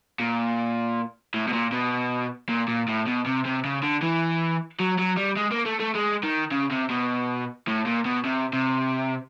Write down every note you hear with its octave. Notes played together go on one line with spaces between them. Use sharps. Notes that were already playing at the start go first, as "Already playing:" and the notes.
A#2
A2
B2
A#2
B2
A#2
A#2
A2
B2
C3
C3
C#3
D3
E3
F#3
F#3
G3
G#3
A#3
A3
A3
G#3
D#3
C#3
C3
B2
A2
A#2
B2
C3
C3